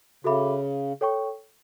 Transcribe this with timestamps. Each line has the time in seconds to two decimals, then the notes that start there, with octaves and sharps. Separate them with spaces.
0.24 C#3 F#4 A4 E5 B5 D6
1.01 A4 C#5 G5 C#6